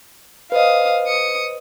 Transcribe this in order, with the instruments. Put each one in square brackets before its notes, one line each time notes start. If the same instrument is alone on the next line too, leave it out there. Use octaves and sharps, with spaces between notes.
[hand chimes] B4 C5 D#5 [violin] F5 D#6
[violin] D#6 C#7